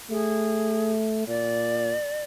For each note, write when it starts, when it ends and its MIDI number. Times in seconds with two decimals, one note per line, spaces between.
0.10 1.23 57
0.10 0.92 68
1.28 1.95 46
1.28 2.24 74